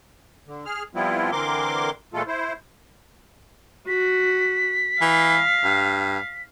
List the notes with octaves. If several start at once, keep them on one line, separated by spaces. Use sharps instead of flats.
D3
G#4 F6
F3 G3 B3 C4 E4 F4
D3 E3 C4 A#4 C6 D6
A#2 E3 G#3 A3 F4 A4
E4 C5
F#4 B6
E3 F5
G2